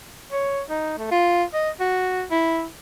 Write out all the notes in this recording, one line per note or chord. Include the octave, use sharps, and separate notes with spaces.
C#5
D#4
A3
F4
D#5
F#4
E4